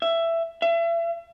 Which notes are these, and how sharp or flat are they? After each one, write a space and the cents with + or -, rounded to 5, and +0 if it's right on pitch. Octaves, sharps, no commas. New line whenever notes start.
E5 +15
E5 +35